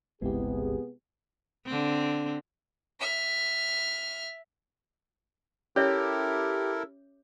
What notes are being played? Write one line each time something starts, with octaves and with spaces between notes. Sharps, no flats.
G1 C#2 C3 G#3 B3 E4 G4 G#4
D3 C4
E5 F6
C#4 E4 G4 A4 A#4 C#5 E5